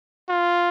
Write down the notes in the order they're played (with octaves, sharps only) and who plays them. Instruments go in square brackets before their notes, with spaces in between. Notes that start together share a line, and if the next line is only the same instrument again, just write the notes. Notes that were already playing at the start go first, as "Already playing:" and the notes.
[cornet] F4